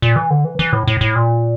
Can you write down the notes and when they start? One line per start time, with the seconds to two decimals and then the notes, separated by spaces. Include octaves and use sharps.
0.02 A#2
0.16 E3
0.30 D3
0.45 E3
0.59 E3
0.73 A2
0.87 A2
1.01 A2
1.15 A#2